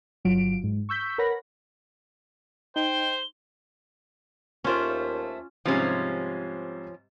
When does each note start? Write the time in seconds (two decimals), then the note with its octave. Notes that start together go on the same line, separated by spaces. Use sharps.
0.25 G1 F#3 F4 D7
0.64 G#2
0.89 C#6 E6 G6 B6
1.18 A#4 B4 C#5 F#5 B5 A#6
2.76 D#4 C5 G5 G7
4.64 D#2 A3 C#4 F4 C5 D5
5.65 G#2 C3 F3 G3 C#4